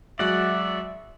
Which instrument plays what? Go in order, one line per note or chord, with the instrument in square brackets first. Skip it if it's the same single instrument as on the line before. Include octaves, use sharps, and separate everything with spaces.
[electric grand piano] F#3 G#3 F#4 [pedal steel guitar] D5 F#5 [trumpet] E5